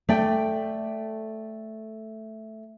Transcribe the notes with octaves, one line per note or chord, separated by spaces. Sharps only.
A3 D5 G5